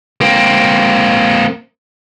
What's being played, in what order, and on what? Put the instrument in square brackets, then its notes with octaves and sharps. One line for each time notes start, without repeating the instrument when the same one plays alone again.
[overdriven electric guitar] A#3 C4